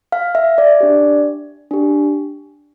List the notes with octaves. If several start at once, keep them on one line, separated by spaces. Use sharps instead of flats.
F5
E5
D5
D4 G4
D4 G4